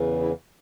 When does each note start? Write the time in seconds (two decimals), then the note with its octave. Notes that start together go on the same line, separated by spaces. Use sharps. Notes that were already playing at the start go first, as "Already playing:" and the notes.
Already playing: E2 C#3 E3
0.20 E4